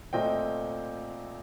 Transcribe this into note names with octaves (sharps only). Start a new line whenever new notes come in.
A#2 A3 C4 D#5 G5